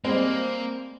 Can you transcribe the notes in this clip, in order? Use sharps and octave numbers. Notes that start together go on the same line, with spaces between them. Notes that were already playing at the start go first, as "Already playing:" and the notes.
G3 G#3 A#3 C4